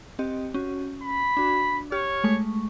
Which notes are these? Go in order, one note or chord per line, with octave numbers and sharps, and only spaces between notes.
C4 G4 D#5
C#4 F#4
B5
D4 F#4
G4 C#5 F6
G#3 A3 C#6